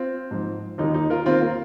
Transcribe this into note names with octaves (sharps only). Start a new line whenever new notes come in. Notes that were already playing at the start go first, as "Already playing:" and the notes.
Already playing: C4 F4
G#2 F3
D#2 D#3 D#4
D#4
F4 A#4
D#2 D#3 C4 F4
F4 A#4